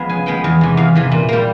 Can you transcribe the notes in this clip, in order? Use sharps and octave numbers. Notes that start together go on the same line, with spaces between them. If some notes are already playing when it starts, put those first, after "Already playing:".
Already playing: F3 G#3 B3
C#3 G#5
F3 G#3 B3 G5
E2
C3 E3
E2 F5
C3 E3
A#2
G3 A#3